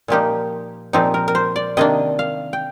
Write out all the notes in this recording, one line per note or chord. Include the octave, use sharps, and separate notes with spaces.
A#2 F3 A#3 D#4 G4
A#2 F3 C4 D#4 G4
A#4
A#4
C5
D5
C3 D#3 A#3 D4 D#5
F5
G5